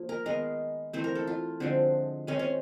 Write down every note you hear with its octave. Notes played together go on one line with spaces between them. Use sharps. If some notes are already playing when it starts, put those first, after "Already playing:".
Already playing: F3 A#3
A#4
D#3 G#3 B3 A#4
E3 A3 C4 C5
A#4
A4
F4
D3 F3 G#3 C4
D#3 G#3 C4 C#4
C#4